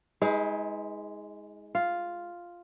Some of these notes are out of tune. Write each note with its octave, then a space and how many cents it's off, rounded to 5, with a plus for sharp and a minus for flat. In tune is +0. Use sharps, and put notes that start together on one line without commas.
G#3 +0 D#4 +45 B4 +0
F4 +0 F5 +0